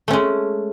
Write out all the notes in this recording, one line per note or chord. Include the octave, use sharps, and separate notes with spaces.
G#3 A3 C#4